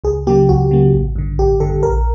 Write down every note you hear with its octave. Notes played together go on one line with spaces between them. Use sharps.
C#2 G#4
C#3 F#3 A#3 G4
C#2 F#4
C#3 F#3 A#3
A1
G2 D3
A1 G4
G2 D3 A4
A#1 A#4